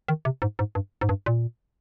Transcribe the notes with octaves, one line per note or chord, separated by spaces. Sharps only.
D#3
C3
G#2
G#2
G2
G#2
G2
A#2